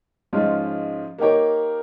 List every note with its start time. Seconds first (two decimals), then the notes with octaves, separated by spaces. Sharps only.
0.33 G#2 F3 G#3 C#4 F4
1.19 A#3 D#4 G4 A#4 C#5